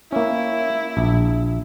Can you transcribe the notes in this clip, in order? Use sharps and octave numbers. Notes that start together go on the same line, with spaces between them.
A#3 C#4 E4
A#1